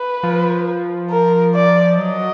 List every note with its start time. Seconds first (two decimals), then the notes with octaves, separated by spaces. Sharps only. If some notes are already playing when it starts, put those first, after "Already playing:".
Already playing: B4
0.23 F3
1.10 A#4
1.54 D5
1.98 F#3 D#5